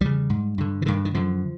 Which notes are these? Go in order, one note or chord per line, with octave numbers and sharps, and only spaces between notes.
E2 C#3 G3
G#2
G2 D3
E3
G2 D3 D#3
D#3
F#2 D3 F3